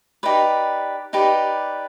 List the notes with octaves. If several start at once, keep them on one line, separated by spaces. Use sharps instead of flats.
D#4 G4 B4 D5
D#4 G4 B4 D5